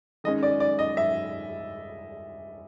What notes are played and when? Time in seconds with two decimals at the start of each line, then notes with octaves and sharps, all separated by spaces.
0.24 D#3 G#3 C#4 D#5
0.43 D5
0.60 D5
0.79 D#5
0.97 E5